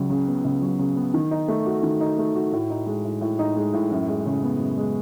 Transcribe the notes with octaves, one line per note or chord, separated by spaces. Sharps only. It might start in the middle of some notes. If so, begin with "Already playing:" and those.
Already playing: C#2 F#3
C#3
B3
C#2
F#3
C#3
B3
D#3
D#4
A3
F#4
D#3
D#4
A3
F#4
A2
D#4
G#3
A2
A2
D#4
G#3
A2
F#2
G#3
C#3
B3
F#2
G#3